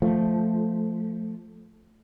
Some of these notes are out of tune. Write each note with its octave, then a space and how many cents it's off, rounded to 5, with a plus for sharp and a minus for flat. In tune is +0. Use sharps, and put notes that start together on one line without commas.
F3 +0 A3 +0